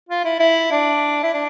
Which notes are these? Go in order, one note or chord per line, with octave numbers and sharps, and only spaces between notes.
F4
E4
E4
D4
E4
D4